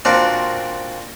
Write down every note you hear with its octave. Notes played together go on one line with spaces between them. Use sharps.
A#2 C4 D4 F#4